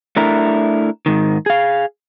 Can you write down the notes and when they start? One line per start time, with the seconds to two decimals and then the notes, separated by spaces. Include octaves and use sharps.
0.16 A3 D4 E4 A#4
1.06 G#2 D#3
1.46 G#4 F5